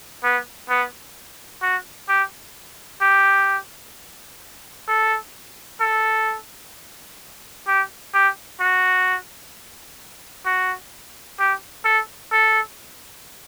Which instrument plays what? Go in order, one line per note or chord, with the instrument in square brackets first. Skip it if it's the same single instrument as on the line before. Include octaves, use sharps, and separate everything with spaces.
[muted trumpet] B3
B3
F#4
G4
G4
A4
A4
G4
G4
F#4
F#4
G4
A4
A4